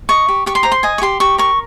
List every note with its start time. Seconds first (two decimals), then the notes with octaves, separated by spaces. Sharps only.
0.09 D#5 C#6
0.28 G4
0.46 G4 C#6
0.55 C6
0.63 C5 A#5
0.72 C6
0.83 D#5 G#5
0.98 C#6
1.02 G4 C6
1.20 G4 C#6
1.38 A#4 C#6